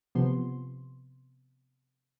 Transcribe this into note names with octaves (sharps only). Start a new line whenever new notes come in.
C3 F3 B3 C6